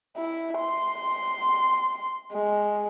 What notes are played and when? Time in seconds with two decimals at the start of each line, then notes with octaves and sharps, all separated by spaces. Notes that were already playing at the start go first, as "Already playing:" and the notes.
0.17 E4
0.59 C6
2.33 G#3